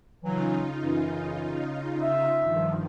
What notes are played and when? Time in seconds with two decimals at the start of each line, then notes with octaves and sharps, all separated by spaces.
0.23 C#3 E3 F#3 D#4 F4
0.81 F#2 E3
2.02 E5
2.39 G2 D#3 F3